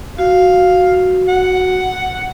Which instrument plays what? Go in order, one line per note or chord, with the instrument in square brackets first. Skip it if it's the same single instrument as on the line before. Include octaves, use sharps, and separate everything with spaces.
[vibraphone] F#4 [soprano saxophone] F5
[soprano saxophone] F#5